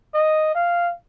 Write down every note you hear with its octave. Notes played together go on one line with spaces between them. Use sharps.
D#5
F5